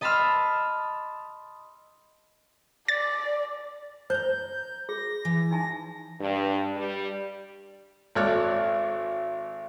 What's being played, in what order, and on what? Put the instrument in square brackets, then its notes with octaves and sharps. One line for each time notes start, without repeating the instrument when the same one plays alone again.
[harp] D#5 A5 B5 C6 E6 F6
[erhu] D5 [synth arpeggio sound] A6
[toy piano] C5 [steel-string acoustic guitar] A5 A#5 [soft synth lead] G6
[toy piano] G#4 [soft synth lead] A#6
[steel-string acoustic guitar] E3
[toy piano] D#4 G#5 A5 [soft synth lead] A#6
[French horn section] G2
G3
[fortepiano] G#1 A4 C#5 D5 F6 F#6